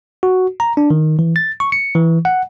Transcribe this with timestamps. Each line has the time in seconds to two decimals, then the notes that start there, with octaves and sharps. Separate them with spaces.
0.23 F#4
0.60 A#5
0.77 D4
0.90 D#3
1.19 E3
1.36 A6
1.60 C#6
1.72 C#7
1.95 E3
2.25 F#5